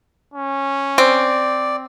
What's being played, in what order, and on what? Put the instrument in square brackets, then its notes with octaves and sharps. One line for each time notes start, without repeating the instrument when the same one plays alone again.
[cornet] C#4
[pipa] C4 [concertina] D5